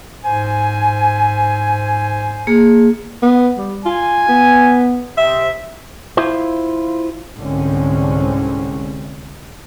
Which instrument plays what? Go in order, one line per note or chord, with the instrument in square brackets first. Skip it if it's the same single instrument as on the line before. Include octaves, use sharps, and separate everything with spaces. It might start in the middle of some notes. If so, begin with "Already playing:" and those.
[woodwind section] G#2 C5 G#5
[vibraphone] A#3 G#4
[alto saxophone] B3
G3
[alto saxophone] F4 [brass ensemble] G#5
[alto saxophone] B3
[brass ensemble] C3 C4 D#5 [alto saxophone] E5
[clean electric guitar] E4 F4 C5
[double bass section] C2 G#2 D3 G#3 C4 C#4